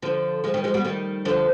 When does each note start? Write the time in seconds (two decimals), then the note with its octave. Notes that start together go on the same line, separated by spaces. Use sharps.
0.02 D3 F3
0.44 F3 G#3
0.54 D#3 G3
0.64 F3 G#3
0.74 G3 B3
0.84 D#3 G3
1.25 D3 F3